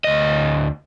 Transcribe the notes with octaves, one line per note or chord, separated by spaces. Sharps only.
D2 D#5